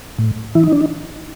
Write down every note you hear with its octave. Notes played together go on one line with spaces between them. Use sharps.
A2
E3 E4
D#4
D4
D#4